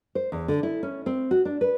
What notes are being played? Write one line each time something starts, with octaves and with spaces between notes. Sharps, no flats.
C5
E2
D3
E4
C#4
C4
F#4
D4
B4